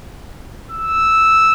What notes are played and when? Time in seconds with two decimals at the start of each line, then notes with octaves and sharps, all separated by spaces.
0.71 E6